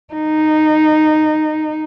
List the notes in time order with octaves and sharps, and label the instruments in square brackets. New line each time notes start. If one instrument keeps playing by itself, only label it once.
[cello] D#4